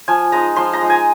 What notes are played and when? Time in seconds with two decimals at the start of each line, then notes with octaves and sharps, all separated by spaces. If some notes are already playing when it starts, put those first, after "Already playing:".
0.08 F3 G#5
0.32 G#3 D#4 A#5
0.56 F3 C6
0.73 A#5
0.81 G#3 D#4
0.90 G#5